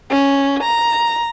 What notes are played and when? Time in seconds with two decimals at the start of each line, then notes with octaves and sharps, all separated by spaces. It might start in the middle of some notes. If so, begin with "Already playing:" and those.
0.11 C#4
0.63 A#5